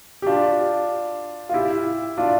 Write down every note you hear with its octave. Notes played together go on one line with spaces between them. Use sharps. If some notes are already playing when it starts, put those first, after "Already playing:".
G4
D4 F4
F4
E4 G4
D4 F4